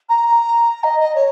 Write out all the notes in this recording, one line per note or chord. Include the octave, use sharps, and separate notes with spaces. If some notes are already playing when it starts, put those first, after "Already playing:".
A#5
D#5
D#5
C#5